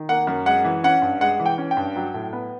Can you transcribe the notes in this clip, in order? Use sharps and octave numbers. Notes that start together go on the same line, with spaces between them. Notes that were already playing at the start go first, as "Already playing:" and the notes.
Already playing: D#3
A#3 F#5
F#2
G#3 F#5
E3
C#4 F#5
G2
G#3 F#5
E3
G5
C#4
G5
G2
F#3
A2
B3